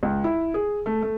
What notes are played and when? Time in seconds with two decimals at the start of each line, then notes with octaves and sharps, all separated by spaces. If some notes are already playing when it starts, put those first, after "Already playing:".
0.03 C#2
0.24 E4
0.54 G#4
0.86 A3
1.02 A3